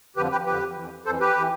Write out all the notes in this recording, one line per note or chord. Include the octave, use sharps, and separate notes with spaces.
F2 D3 F3 G4 B4
G4 B4
F2 D3 F3 G4 B4
F2 E3
F2 E3 A4 C5
G4 B4
E3